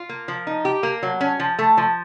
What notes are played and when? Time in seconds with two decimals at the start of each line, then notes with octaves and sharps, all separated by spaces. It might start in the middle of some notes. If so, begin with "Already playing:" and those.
Already playing: F4
0.09 A#3
0.28 F3
0.47 D#4
0.65 G4
0.83 A#3
1.03 F#3
1.21 C#4
1.40 F3
1.59 A3
1.77 F3